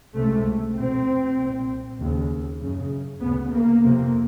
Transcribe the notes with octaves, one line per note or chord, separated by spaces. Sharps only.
C#2 C3 A3
E2 B2 C4
C2 A#2
D#2 C#3
F#2 C#3
D2 C#3 B3
A#3
F2 C3